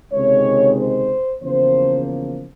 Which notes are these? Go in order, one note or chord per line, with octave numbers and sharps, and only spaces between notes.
C#2 C3 D#3 G#3 C#5
C5
E2 C#3 F3 A#3 C5